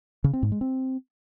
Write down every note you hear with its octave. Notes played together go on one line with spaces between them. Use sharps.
C#3
C4
G#2
G#3
C4